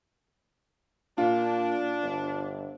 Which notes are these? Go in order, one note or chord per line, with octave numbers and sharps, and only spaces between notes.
A#2 D4 F4
G1